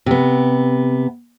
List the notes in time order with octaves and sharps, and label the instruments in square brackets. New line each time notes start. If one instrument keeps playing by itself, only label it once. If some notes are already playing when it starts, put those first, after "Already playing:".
[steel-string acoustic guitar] C3 B3